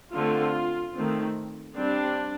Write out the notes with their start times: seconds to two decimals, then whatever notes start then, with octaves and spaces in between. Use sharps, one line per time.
0.13 D3 A3 C4 F4
0.96 D#3 A3 C4
1.78 G3 C4 D4